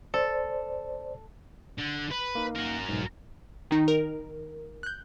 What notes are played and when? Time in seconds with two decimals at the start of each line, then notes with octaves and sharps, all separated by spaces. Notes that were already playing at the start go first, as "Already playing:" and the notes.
0.14 A4 C5 D5
1.78 D3
2.11 B4
2.35 A#3 D#4
2.55 F#4 A#4
2.89 B1 G#2
3.71 D#3 D#4
3.88 A#4
4.83 F#6 G6